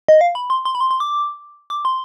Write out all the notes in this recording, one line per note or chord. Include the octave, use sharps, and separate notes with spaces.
D#5
F5
B5
C6
C6
B5
C6
C6
D6
D6
C6